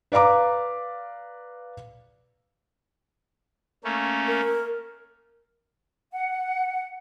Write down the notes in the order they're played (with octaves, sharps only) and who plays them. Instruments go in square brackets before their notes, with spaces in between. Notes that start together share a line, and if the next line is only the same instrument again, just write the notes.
[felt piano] B4 D5 F5 A#5 D6
[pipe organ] A3 A#3 C#4
[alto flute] A#4
[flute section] F#5